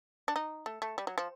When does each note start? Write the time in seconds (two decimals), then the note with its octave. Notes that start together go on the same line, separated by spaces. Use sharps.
0.28 D4
0.36 D#4
0.66 A3
0.82 A3
0.98 G3
1.07 F#3
1.18 F3